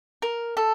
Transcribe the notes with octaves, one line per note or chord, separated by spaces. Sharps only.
A#4
A4